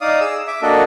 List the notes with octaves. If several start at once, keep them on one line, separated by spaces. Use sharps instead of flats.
D#4 D5 F5 D#6
G#4 E6
E5 D6
A#3 D4 F#4 A4 D#5